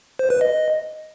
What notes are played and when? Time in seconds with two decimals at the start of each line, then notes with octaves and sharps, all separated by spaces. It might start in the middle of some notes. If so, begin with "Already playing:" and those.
0.19 C5
0.30 B4
0.41 D#5